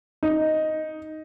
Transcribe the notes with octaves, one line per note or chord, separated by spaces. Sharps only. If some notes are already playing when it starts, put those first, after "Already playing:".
D#4